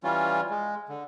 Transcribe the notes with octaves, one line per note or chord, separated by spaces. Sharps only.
E3 G3 C#4 F4
G#3
D3